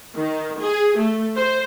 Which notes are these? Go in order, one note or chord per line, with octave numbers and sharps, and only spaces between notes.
D#3
G#4
A3
C5